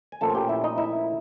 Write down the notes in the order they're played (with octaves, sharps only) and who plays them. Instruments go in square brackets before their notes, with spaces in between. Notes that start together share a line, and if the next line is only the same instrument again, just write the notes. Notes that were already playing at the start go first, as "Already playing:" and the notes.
[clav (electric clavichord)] G#5
A#2 F3 A3 C#4 A4 A5
G#5
G4 G5
E4 E5
D#4 D#5
E4 E5